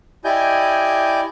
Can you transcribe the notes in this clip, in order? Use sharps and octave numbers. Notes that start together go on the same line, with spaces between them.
E4 G4 D5 D#5 G#5 G6